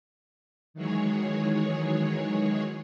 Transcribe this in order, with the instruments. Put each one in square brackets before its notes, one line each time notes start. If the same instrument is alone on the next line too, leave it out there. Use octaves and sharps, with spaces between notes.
[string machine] D#3 E3 F#3 G#3 G#4 C#5